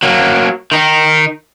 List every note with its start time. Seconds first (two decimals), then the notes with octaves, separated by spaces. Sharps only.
0.03 F#3 A#3
0.72 D#3 D#4